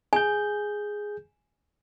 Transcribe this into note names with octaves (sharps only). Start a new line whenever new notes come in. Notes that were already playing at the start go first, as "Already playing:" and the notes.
G#4 G#5 G6